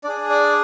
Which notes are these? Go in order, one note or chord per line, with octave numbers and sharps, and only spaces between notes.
D4 G#4 D5
D5